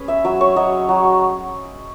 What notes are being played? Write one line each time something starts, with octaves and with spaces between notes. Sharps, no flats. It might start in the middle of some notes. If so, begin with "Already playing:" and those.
Already playing: C#4 G#4 B4
E5
F#3 E5
C#5
F#3 D#5
F#3